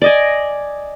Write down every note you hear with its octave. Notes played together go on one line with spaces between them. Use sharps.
D5 D#5 G#5